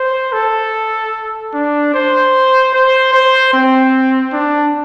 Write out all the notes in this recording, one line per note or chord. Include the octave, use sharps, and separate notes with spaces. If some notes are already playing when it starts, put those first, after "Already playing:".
Already playing: C5
A4
D4
C5
C5
C5
C4
D4